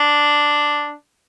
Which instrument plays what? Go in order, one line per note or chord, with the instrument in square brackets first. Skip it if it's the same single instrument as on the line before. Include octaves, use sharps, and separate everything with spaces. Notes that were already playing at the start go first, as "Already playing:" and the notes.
Already playing: [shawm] D4